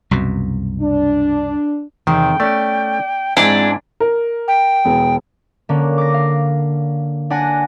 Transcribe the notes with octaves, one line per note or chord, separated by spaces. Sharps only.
C2 F#2 B2
D4
E2 C3 D#3 C4 G5
A3 C#4 D5
G#2 G#3 C4 D4 E4 G#5
A#4
G5
E1 B3 G#4
D3 A#3 C#4
D6 A#6
F5
D4 F#5 G#5 A#6